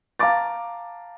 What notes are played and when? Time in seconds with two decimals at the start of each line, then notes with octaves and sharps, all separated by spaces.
0.19 F5 A5 A#5 D6 A6